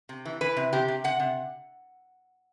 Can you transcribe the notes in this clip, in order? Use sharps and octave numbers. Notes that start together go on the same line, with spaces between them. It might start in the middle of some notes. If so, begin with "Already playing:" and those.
C3
E3
E3 B4
C3
C3 G4
C3
C3 F#5
C3